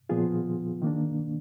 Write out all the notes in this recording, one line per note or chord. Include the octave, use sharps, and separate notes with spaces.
A#2 F3 B3 F4 G#4
D#3 A#3 D4